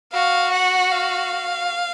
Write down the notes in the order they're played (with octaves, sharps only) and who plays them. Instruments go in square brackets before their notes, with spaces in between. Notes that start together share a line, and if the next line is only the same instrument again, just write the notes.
[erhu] F#4 [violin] F5
[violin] F#5
F5